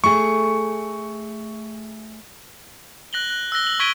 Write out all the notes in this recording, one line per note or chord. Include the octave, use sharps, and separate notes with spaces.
A3 G#4 C#6
F#6 A#6 F#7 G7
F#6
E6 F#6 A#6 G7
F#7
C#6 G#6 B6 D7 D#7 G7